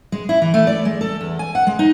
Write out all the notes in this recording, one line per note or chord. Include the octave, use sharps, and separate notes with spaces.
G#3
E4
E3
A3
D5
G#3
A4
E2
G#5
F#5
G#3
D#4